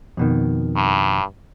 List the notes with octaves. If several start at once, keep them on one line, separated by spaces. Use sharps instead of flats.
F2 B2 D#3
G2